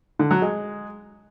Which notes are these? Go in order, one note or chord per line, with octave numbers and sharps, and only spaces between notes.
D3
F#3
G#3